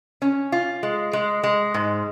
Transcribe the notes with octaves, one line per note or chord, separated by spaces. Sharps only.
C#4
F4
G#3
G#3
G#3
G#2